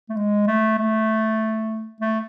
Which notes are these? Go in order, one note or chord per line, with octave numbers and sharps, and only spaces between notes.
A3
G#3
A3
A3
A3